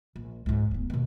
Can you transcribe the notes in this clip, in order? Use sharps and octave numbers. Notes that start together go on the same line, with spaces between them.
A#1
C#2 G#2
D1 B3
D#2 B2